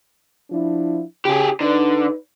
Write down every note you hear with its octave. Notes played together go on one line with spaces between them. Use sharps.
F3 D4 E4
C#3 G4 G#4
D3 D#4 B4